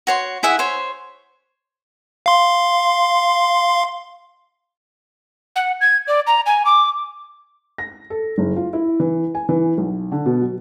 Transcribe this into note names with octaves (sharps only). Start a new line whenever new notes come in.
F#4 C#5 C6
E4 G#4 E5 F#5
C5 C#5
F5 C6
F#5
G#6
D5
A#5
G#5
D6
A#6
A4
F#1
F4
E4
E3
G#5
E3
B1
D3
B2
F#3